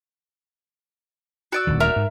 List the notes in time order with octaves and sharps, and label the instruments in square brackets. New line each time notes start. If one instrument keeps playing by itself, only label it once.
[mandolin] F#4 D5 E6
[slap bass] D#1 D2 D#3
[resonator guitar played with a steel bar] A#4 E5 A#5
[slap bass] G#2